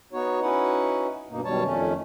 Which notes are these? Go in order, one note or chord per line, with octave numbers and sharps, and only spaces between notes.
B3 D#4 F#4 C#5
C#4 D#4 E4 F#4 B4 F#5
G2 B2 A#3 D#4
F#2 B2 D#3 G3 C#5 A5
F2 D#3 A3 C#4